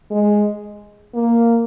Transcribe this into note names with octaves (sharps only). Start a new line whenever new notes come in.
G#3
A#3